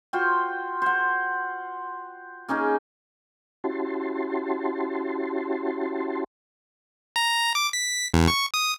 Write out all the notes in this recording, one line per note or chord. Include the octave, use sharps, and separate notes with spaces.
F4 F#4 C5 G5
C5 F#5
A#3 C#4 D#4 G#4
C#4 E4 F#4 G4 A5 C6
A#5
D6
B6
E2
C#6
D#6